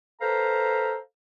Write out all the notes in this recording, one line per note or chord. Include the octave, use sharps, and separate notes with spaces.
A4 B4 C5 F5 A#5